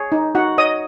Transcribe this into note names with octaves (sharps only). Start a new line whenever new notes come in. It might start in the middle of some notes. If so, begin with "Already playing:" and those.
Already playing: G#4 C#5
D#4
D#4 F#4 F#5
C#5 D#5 D#6